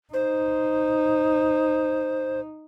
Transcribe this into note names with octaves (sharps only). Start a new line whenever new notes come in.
D#4 C5